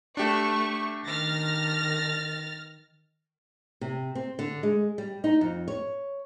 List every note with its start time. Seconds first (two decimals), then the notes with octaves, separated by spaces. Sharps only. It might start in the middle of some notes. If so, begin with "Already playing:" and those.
0.17 A3 D4 G4 C#6
1.06 D#3 F6 A6 A#6
3.81 C3
4.15 C4
4.39 D3
4.63 G#3
4.98 G3
5.24 D#4
5.41 F2
5.68 C#5